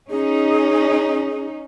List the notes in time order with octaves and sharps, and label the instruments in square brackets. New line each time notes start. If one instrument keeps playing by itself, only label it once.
[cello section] C#4 D#4 [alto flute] G#4